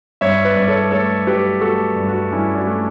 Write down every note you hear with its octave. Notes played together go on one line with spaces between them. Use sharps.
G2 C#5 E5
B4 D5
G2 D5
A4 C#5
A3 A4 C#5
F#3 G4 B4
A3 F#4 A4
G2
D4 F#4
G2 C#4 E4
D4 F#4
A3